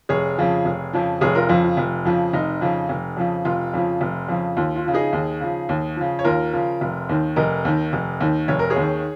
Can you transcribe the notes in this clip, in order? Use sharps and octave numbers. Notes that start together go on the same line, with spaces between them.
F1 G#4 C#5
F2 C#3 F3
F1
F2 C#3 F3
F1 G#4 C#5
F4 A#4
F2 C#3 F3 F4
F4
F1
F2 C#3 F3
F1 D#4
F2 C#3 F3
F1
F2 C#3 F3
F1 F4
F2 C#3 F3
F1
F2 C#3 F3
D#2 F4
F4
C#3 F3
D#4 G#4
D#2
C#3 F3
D#2
C#3 F3
C#5
D#2 F4 A#4
C#3 F3
F1
D#2 D#3
F1 A#4 D#5
D#2 D#3
F1
D#2 D#3
F1 C#5
A#4
G#4 C#5
D#2 D#3